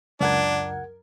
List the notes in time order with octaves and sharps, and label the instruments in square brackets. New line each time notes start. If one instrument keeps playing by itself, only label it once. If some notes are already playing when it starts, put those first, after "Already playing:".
[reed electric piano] C#2 F#5 G#6 [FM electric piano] F#2 A#4 [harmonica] D4